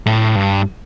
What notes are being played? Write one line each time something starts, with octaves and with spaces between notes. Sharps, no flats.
A2
G2